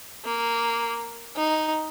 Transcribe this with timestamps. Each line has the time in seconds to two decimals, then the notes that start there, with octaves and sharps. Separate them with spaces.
0.25 A#3
1.37 D#4